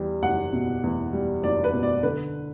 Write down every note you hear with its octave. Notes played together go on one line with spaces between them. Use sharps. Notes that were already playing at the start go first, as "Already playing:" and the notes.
Already playing: E2 G3
F#1 F#5
B2
E2
G3
F#1 D5
B4
B2
D5
D3 B4